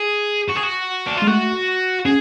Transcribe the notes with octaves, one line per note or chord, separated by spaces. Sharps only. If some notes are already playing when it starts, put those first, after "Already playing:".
Already playing: G#4
F#4
G#4
F#4
D4
F4
G#3
A3 F#4
C#4 G#4